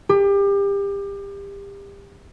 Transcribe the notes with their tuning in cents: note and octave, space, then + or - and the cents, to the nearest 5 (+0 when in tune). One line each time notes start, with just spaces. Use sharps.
G4 +30